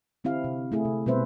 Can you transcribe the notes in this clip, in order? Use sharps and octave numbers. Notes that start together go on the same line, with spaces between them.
D3 C4 E4 G4 F5
C3
A3 E4 G#4
C3
B2 G3 C4 B4 C5 E5